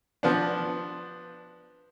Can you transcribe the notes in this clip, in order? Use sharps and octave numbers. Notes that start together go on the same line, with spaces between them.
F3 B3 D4